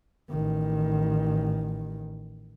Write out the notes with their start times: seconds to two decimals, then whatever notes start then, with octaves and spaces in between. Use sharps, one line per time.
0.30 A1 D#3